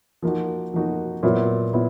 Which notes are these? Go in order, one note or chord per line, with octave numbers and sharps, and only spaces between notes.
F3 A#3 D#4 F#4
F3 A#3 D#4 F#4
A#2 F#3 B3 E4
A#2 B3 E4